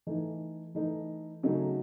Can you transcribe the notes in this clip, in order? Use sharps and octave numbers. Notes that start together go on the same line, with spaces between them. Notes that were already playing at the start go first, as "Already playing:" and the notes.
E3 A3 D#4
E3 A3 D#4
C#3 F#3 A3 D#4